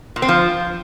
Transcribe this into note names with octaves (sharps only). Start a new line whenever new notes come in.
A#2
C4
F3